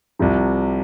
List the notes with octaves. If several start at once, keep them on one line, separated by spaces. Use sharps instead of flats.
C2 C3 F3